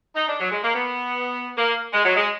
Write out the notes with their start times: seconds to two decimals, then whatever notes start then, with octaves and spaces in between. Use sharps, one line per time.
0.16 D#4
0.28 D4
0.40 F#3
0.51 G#3
0.63 A#3
0.75 B3
1.58 A#3
1.93 G#3
2.05 F#3
2.17 G#3